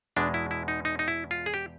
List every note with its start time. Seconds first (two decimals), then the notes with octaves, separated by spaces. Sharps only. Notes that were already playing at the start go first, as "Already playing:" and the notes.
0.17 E2 B2 G#3 D4
0.34 E4
0.51 E4
0.68 D#4
0.85 D#4
0.99 D#4
1.08 E4
1.31 F4
1.46 G#4
1.54 G4